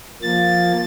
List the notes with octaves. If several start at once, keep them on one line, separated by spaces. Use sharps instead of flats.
F3 A#3 A6